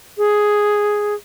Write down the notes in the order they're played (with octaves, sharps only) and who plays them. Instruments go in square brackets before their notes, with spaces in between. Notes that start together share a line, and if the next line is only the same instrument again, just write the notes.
[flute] G#4